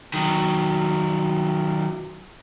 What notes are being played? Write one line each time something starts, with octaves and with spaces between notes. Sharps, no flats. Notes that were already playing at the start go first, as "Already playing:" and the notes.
D#3 F#3